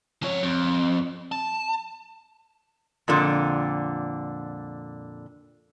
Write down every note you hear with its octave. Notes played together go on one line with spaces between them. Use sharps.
F3 C#5
F2
A5
F2 A#2 D3